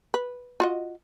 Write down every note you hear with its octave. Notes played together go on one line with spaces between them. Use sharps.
B4
F4 F#4 D#5